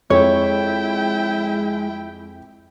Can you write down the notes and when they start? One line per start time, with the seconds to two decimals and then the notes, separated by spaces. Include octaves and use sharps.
0.10 F2 G#3 E4 C#5 G5